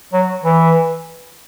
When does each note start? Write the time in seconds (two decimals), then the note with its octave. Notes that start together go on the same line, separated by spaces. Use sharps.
0.13 F#3
0.44 E3